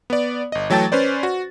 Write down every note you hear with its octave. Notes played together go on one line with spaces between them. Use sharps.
B3 D5
G1 D#5
E3 F#3 A3 G5 A5 A6
C#4 B4 C5 D5
F#4